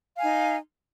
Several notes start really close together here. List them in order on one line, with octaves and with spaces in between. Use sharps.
F5 G#5 D#4